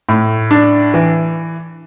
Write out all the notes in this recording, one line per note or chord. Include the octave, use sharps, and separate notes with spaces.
A2
D4
E3